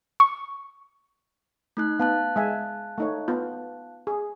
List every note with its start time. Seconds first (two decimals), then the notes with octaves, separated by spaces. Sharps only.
0.20 C#6
1.77 A3 D#4 F#6
2.00 B3 F5 A5 F#6
2.36 G#3 E5 G#5
2.98 A3 D#4 C#5
3.28 B3 F4
4.07 G#4